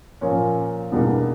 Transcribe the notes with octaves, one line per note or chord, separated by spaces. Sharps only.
A#2 F3 A#3 C#4
E2 B2 G3 A#3 D4